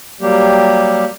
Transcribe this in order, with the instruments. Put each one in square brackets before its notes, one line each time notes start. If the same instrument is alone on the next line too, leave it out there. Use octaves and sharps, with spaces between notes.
[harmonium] F#3 G3 A#3 G4